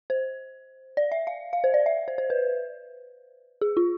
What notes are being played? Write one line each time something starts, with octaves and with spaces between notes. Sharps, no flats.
C5
D5
E5
F5
F5
C5
D5
E5
C5
C5
B4
G#4
F4